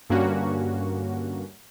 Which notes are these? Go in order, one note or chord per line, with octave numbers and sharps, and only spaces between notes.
G2 D3 A#3 C#4 F#4